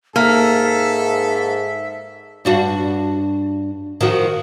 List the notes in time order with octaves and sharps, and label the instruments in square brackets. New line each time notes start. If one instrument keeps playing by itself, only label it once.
[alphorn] G#2 [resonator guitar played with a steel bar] A#3 [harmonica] A4 [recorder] E5
[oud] G2 D4 F#4
D#3 F3 F#4